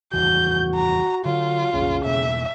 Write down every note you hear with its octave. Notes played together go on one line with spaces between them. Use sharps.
G#1 E2 E3 F#4 G6
A#5
D3 F#3 F4
B1 F2 C#3
E1 B2 A#3 E5